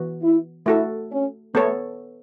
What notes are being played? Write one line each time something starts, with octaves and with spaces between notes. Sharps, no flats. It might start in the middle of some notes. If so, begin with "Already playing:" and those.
Already playing: E3 B3 F#4
E4
A3 E4 F#4 A4
C#4
A3 B3 A4 C#5